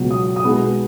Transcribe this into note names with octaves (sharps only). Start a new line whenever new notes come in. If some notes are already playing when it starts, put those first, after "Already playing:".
Already playing: C#2 B2 F#3
D#6
D#6
B1 B2 G#3 B3